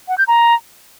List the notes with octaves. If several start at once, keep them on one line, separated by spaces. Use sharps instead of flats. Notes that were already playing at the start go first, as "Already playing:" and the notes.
F#5
G6
A#5